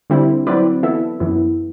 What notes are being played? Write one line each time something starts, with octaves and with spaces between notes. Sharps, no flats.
D3 G3 C4 E4
F#3 C4 E4 B4 D5
E3 B3 E4 A4 E5
F#2 E3 B3 E4